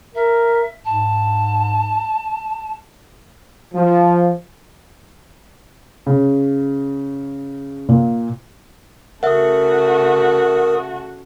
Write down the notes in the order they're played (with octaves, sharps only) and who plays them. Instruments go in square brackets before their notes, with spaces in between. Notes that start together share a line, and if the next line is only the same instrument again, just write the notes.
[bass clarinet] A#4 [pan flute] E5
[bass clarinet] G#2 [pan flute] A5
[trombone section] F3
[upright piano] C#3
A#2
[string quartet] C#3 A3 F#4 [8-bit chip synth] A#4 D#6 [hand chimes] E5 F#5